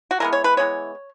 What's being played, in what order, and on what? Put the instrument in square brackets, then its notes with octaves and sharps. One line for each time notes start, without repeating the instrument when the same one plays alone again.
[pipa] F#4
E3 G#3 B3 A#4
C#5
B4
E3 G#3 B3 C#5